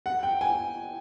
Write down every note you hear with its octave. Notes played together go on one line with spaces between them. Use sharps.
F#5
G5
G#5